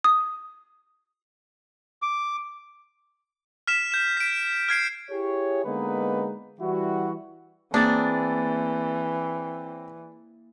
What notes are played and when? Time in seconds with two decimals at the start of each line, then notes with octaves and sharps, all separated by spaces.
0.04 D#6
2.02 D6
3.67 F6 B6 E7
3.92 G6 E7
4.17 B6 D7
4.69 F6 G#6 C7 D7
5.11 E4 G4 G#4 C#5
5.65 D3 G#3 A#3 B3 D#4 B4
6.61 E3 G3 E4 F#4
7.74 E3 A#3 C4 D4 G#4 A6